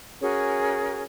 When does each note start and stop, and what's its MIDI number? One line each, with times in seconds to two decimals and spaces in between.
0.21 1.03 61
0.21 1.03 66
0.21 1.03 68
0.21 1.03 70